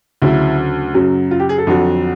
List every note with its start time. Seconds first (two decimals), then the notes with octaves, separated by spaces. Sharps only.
0.22 D2 C#3 F#3 E4
0.94 F#2 C#3 F#3
1.31 F4
1.40 G4
1.49 G#4
1.58 A4
1.67 F2 D3 F#3